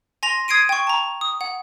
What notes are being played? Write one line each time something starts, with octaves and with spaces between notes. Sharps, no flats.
G#5 C6 A#6 F7
D#6 G#6 C7 D7 D#7
G5 C#6
A5 A#5
D#6
F#5